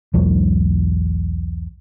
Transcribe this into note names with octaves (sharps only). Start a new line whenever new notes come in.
B1 E2 G#2 F#3